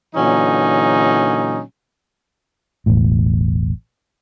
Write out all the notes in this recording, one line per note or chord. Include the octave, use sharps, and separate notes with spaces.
A#2 D3 E3 F#3 C#4 D#4
E1 A1 A2